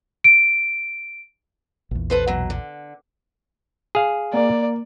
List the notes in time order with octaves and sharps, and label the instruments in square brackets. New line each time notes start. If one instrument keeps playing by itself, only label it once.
[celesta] D7
[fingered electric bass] A#1 E2
[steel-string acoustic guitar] A4 B4 C5
B2 F#3
D3
[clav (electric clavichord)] G#4 F5
[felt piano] A#3 [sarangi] D5